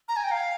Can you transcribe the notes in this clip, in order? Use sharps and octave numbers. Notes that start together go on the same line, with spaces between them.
A#5
G#5
G5
F5